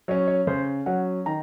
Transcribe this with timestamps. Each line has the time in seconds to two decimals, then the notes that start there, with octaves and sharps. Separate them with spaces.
0.08 F#3 C#4 C#5
0.28 C#5
0.47 C#3 C5
0.86 F#3 C#4 F#5
1.26 D#3 A#5